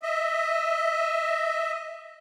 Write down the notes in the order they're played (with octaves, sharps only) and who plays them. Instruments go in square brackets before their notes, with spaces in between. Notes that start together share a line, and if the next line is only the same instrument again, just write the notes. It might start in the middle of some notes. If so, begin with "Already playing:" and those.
[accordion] D#5 E5